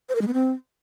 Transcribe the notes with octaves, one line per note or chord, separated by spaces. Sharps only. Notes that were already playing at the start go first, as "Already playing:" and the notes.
C5
A#4
G#3
B3
C4